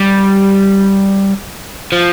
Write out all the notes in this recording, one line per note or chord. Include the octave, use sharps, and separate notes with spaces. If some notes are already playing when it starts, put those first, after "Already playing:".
Already playing: G3
F3